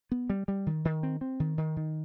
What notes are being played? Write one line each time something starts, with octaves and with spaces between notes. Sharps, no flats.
B3
G3
G3
D#3
D#3
C4
C4
D#3
D#3
D#3